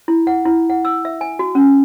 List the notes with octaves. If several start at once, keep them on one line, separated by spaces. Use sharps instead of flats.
E4
F#5
E4
F#5
E6
E5
G#5
F#4
C#4